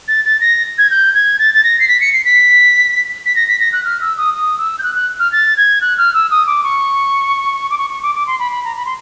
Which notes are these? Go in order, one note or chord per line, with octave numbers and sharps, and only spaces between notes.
A6
A6
A#6
G#6
G6
G#6
A6
A6
A#6
C7
B6
C#7
C7
B6
B6
A#6
B6
A#6
F#6
F6
E6
D#6
D#6
E6
G6
F#6
F#6
F6
A6
G#6
F#6
F6
E6
D#6
D6
C#6
D6
C#6
C#6
D6
D6
C6
B5
B5
A#5
B5
C6